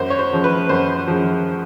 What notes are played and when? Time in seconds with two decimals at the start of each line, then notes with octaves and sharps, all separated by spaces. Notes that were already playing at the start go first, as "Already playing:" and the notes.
Already playing: F#2 C5
0.10 C#5
0.19 C5
0.32 C#3 F3
0.44 B4
0.69 F#2 C5
1.07 C#3 F3